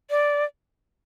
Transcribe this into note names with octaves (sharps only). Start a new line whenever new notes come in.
D5